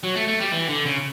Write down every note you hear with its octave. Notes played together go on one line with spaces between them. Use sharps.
F#3
A3
A3
G3
E3
D3
C#3